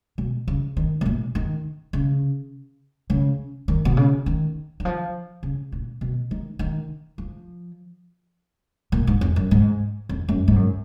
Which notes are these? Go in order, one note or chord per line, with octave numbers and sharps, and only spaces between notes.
B2
C#3
D#3
B2
A#2
D#3
C#3
C#3
D#3
B2
C#3
D#3
D#3
F3
C#3
A#2
B2
D#3
D#3
F3
A#2
G#2
F2
F#2
G#2
F2
F#2
G#2
F#2